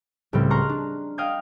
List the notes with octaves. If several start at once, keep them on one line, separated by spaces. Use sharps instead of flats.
C#2 A2 G3 C4
A#5 C6 C#6 F6 F#6
D4
D#5 F5 G5 D#6 G6 G#6